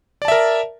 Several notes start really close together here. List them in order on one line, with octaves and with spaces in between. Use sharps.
D5 A5 E5 A#4